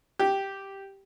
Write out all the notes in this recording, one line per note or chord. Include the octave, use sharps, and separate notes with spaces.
G4